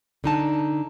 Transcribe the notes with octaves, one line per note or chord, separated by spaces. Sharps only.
D3 D#4 A5